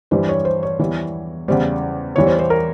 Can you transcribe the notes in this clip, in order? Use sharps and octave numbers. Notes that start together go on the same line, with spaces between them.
G2 E3 G3 C5
C#5
C5
C#5
E2 E3 G3
E2 C#3 G3 C5
E2 E3 G3 C#5
C5
C5
A#4